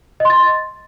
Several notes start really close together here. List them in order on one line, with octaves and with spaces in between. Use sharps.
D#5 C6 A6